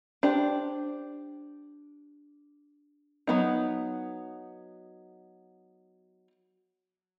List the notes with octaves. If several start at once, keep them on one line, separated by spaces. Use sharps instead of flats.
D4 G4 C5
F#3 B3 D#4